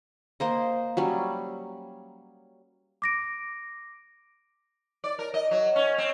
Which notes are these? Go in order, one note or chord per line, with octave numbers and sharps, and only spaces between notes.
A#3 C5 D#5
F#3 G3 C#4
D6 A#6 D7
D5
A#4
D#5
F#3
C#4
C4